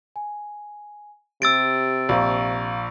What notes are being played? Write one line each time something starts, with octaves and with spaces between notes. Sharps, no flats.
G#5
C3 G4 E6 A6 D7
A#1 F5 A#5 C#6